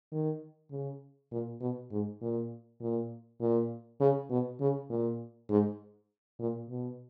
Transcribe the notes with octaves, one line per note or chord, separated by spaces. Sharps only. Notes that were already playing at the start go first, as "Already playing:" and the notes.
D#3
C#3
A#2
B2
G#2
A#2
A#2
A#2
C#3
B2
C#3
A#2
G#2
A#2
B2